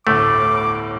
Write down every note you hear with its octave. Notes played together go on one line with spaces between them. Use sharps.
G1 D2 A2 A3 D6